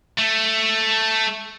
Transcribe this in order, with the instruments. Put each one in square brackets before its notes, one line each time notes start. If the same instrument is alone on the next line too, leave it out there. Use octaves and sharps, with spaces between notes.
[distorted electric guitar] A3